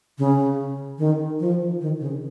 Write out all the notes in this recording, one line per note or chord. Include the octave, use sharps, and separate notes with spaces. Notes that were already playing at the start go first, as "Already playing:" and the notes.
C#3
D#3
F3
D#3
C#3